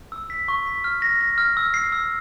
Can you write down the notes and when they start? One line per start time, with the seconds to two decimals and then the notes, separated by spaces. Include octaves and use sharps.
0.12 E6
0.30 B6
0.48 C#6
0.67 B6
0.84 F6
1.02 A#6
1.21 A#6
1.38 F6
1.57 E6
1.74 C7
1.92 E6